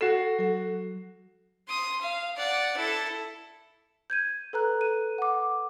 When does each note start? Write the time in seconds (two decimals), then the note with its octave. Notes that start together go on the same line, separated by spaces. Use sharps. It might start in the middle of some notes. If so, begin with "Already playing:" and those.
0.01 F#4 A4 C7 E7
0.39 F#3 A4
1.68 C6 D#6
2.01 F5
2.36 D5 F#5
2.77 E4 A4
4.10 G6 G#6 D#7
4.53 A4 B4 A#5 F#6
4.81 D#7
5.18 F#5 D6